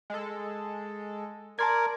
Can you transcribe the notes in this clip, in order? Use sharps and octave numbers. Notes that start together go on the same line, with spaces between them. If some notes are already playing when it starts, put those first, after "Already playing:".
G#3 A4
A#4 D5 A5 C6 G#6